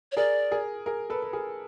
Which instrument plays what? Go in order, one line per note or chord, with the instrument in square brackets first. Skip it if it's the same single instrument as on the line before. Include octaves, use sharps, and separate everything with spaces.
[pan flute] C#5
[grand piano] G#4 A#4 [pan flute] D5
[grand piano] G#4 A#4
G#4 A#4
A4 B4
B4
G#4 A#4